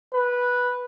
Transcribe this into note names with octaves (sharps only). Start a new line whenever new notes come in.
B4